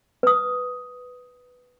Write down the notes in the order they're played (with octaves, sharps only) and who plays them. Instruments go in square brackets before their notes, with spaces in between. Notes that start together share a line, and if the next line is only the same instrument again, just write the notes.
[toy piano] B4 D#6